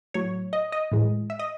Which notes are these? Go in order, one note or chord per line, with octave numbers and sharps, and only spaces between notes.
A2 F#3 C#5
D#5
D#5
A2 E3 G#3
E5
D#5